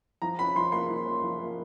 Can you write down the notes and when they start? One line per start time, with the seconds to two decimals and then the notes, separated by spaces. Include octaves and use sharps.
0.22 F3 A#5
0.39 C#4 B5
0.56 F3 C6
0.72 A#3 C6
0.89 F3
1.06 C#4
1.23 F3
1.39 A#3